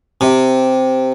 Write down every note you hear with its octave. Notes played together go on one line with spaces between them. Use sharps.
C3